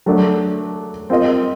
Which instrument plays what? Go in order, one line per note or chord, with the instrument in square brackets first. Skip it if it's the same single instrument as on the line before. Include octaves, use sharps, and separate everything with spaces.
[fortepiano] F#3 A3 D4
C4 F4 A#4 D#5